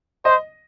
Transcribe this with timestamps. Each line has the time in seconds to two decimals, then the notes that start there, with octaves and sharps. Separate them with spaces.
0.25 C5 D#5